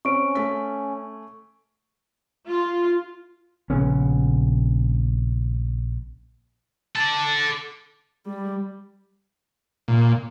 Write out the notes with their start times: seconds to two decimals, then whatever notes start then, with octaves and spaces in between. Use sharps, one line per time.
0.05 C4 C#4 C#6 D7
0.35 A3 G#5 B6
2.49 F4
3.70 A#1 C#3 B3 C#4
6.96 A4 D5
8.26 G3
9.88 A#2